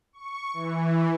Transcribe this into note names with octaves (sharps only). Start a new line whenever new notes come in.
C#6
E3